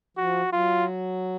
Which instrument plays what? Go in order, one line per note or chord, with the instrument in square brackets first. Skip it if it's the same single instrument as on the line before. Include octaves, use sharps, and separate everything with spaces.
[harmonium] F3 [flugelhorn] F#4
[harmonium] F#3 [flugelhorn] F4